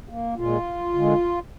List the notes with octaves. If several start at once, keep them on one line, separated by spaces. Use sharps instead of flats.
A#3
A#2 G#3 F4
D3 G#3